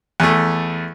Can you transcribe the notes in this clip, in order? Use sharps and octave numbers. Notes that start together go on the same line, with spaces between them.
E2 A3